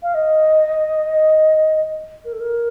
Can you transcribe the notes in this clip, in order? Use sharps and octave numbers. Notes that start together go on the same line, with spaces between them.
F5
D#5
A#4
A4
A#4